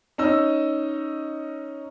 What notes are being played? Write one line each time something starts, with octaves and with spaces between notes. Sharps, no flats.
C#4 D#4 D#5 E6